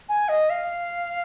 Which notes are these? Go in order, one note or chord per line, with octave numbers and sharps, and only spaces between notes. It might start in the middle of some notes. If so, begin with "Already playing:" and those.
G#5
D#5
F5